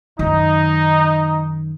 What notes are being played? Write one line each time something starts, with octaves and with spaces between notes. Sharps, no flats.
F#2 D#3 D#4